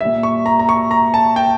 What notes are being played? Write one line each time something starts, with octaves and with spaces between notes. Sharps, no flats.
A#2 G3 E5
C#6
A#5
A#5
C#6
A#5
A5
G5